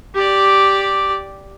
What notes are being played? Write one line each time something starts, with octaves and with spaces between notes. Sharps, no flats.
G4 D5